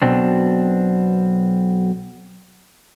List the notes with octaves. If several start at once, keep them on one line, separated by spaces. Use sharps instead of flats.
B1 B2 C4 D4